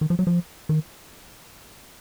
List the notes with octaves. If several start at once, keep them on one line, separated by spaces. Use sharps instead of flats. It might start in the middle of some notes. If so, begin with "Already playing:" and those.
D#3
F3
F#3
F3
D#3